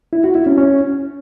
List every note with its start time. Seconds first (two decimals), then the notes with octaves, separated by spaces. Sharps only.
0.13 E4
0.24 F#4
0.35 E4
0.46 C#4
0.58 C#4